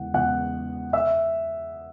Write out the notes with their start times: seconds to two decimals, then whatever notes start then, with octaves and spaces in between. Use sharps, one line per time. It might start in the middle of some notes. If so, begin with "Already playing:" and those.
Already playing: E2 C#3 E3 G#3 F#5
0.14 E2 C#3 E3 G#3 F#5 F#6
0.93 E5 E6